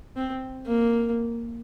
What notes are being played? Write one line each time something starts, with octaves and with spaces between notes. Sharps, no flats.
C4
A#3